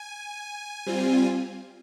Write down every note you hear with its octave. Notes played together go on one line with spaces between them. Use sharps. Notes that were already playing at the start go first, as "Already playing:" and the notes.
Already playing: G#5
G3 C4 F4